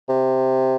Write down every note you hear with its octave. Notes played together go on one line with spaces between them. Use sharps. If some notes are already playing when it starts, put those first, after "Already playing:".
C3